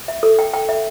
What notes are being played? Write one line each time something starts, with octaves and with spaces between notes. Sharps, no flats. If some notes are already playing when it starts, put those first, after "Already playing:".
E5
A4
G5
G5
E5